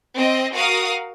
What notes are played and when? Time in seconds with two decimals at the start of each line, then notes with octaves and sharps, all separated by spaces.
0.16 C4 D#5
0.54 F#4 A#4 F5 D#6